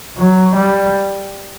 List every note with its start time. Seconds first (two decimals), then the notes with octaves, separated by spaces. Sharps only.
0.17 F#3
0.55 G3